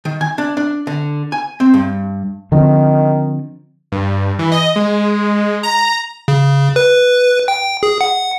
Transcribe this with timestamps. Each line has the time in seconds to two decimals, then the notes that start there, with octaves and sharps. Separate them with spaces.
0.05 D#3
0.21 G#5
0.38 D4
0.57 D4
0.87 D3
1.32 G#5
1.60 C4
1.74 G2
2.52 D3 D#3 F3 C4
3.92 G2
4.39 E3
4.52 D#5
4.76 G#3
5.63 A#5
6.28 C#3
6.76 B4
7.48 G5
7.83 G#4
8.01 F#5